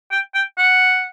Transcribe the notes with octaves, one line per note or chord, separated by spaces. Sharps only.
G5
G5
F#5